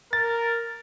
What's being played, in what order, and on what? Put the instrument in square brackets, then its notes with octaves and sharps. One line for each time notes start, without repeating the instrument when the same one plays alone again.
[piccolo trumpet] A#4 [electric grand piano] A6